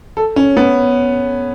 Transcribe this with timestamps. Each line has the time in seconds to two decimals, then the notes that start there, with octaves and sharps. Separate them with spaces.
0.17 A4
0.36 C#4
0.57 B3